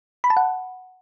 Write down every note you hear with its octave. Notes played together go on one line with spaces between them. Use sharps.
B5
A5
F#5